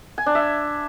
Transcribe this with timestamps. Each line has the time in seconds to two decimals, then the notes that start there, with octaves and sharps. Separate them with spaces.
0.18 G#5
0.26 D4
0.35 E5